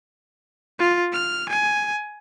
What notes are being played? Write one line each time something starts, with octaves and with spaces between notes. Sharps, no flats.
F4
F6
G#5